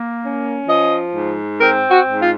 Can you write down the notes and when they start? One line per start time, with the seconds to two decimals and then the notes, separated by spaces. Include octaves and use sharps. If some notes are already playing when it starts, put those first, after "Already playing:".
Already playing: A#3
0.23 C#4
0.68 F3 D#5
1.14 G#2
1.60 C4 A#4
1.90 F#4
2.06 G#2
2.21 F4